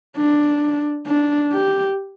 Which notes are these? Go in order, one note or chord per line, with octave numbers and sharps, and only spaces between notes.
D4
D4
G4